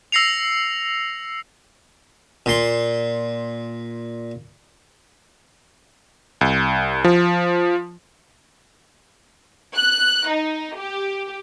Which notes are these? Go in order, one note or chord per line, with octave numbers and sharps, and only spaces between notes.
E6 A#6 C7 C#7 F7
A#2 C6
C2
F3
F#6
D#4
G4